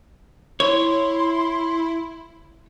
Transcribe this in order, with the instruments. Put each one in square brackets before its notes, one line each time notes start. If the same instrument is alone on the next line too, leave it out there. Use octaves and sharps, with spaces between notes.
[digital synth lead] E4 [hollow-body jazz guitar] C#5 [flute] C6